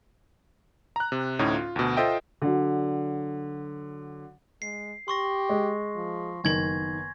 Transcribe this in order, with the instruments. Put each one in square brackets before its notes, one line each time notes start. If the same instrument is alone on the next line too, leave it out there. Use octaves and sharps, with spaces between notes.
[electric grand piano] A#5 F#6
C3
D2 A2 C#4 D#4
F4
D2 B2
F4 A4 C5 D#5 E5 G5
[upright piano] D3 F#3
[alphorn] G#3 [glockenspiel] C7
[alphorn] G4 [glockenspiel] C6 C#6 A#6
[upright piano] G#3
[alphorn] F3
[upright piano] F#1 D#3 F#7 [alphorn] B3 [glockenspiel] G#5 G#6 A#6